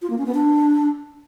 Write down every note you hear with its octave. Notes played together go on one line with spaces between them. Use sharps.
F4
A#3
C#4
B3
D4